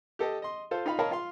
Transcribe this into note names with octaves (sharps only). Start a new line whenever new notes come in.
G4 A4 D#5
D#5 C6
F4 A4 C5
D#4 F4 F5 B5
A#4 C#5 D#5 F5 A5 B5
F4 F5 C6